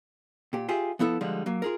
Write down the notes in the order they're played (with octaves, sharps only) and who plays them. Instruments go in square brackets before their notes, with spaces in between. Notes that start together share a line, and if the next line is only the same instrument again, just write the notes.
[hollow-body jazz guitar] A#2 G4
F4 G4 G#4 E5
F3 B3 E4 A4
D3 F3 G3 G#3
F#3 A#3
F4 G#4 A#4